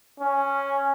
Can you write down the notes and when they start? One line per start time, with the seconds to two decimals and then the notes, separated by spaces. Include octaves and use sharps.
0.20 C#4